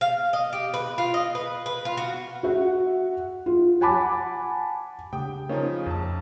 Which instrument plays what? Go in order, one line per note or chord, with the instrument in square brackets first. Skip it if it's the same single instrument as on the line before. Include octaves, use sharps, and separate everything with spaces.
[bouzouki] F5
D#5
G4
B4
F4
D#5
B4
B4
F4
F#4
[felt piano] F#4 E5 F#5
F4
F#5 G#5 A5 B5 D6
[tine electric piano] C#3 G4 D#6 [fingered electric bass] A3 D4 [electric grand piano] G5
[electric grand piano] C#3 F3 [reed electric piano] A#3 C#4 D#4 [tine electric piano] A#5
[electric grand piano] A#1 A5 [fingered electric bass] F2